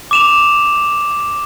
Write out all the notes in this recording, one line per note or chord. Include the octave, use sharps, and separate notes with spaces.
D6 E7 F7